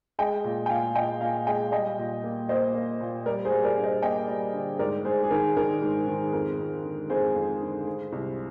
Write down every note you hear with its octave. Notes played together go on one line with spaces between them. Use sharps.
G#3 D#5 G5
A#2
G5
A#2 F5 G#5
A#2 D#5 G5
A#2 F5 G#5
G#3 D#5 G5
G3 D#5 G5
A#2
A#3
A#3 C5 D#5
A#3
A#2
G3 A#4 D5
G#4 C5
G3
A#4 D5
G2
C5 D#5
A#3 D#5 G5
G3
D3
G#2 A#4 D5
G#2 G#4 C5
G#4
D#3 A#4
D#3 A#4
G#2
D#3
F2 A#4
F2
D3
F2 G#4 C5
F2
D3
G#3
C2